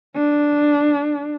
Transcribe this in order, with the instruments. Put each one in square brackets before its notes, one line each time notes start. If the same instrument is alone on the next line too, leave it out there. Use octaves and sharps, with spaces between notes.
[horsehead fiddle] D4